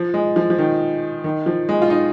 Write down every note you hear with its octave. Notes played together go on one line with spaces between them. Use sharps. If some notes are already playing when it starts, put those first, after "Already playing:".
Already playing: F3
G#3
F3
F3
D#3
D#3
F3
G#3
F4
D#4